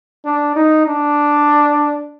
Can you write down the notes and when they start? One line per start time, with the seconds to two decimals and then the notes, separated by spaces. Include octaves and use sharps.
0.25 D4
0.56 D#4
0.87 D4